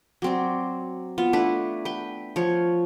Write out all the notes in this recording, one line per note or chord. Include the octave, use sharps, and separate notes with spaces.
F#3 C4 D5
B3 F4
A3 D4 E4 B4
B4 G5
F3 C#5